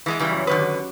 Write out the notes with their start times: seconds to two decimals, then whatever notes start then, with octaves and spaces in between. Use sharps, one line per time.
0.06 E3 G#3 B3
0.19 C#3 E3 G3
0.31 F#2
0.47 D3 D#3 B4
0.59 G4